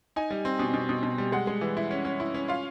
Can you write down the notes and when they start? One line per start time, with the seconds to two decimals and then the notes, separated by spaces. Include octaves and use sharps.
0.16 D#4 G#5
0.30 G3
0.45 C4
0.59 B2
0.74 B2
0.89 B2
1.03 B2
1.18 G3
1.32 G#3 F#5
1.47 G#3
1.61 E3
1.77 E4
1.91 C#4
2.05 C#4
2.20 E4
2.34 C#4
2.48 F4 F5